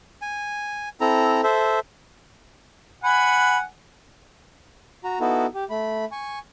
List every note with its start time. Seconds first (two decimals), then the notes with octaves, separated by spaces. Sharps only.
0.22 G#5
1.01 C4 E4 A4 A#5
1.43 A4 C5 E5
3.04 F#5 G#5 B5
5.04 F#4 A#5
5.20 B3 D#4 E4 F#4 A4
5.55 G4
5.70 A3 B5
6.12 G#5 C#6